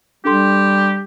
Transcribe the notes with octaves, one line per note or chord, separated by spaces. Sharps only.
G3 D4 G4 A4 C6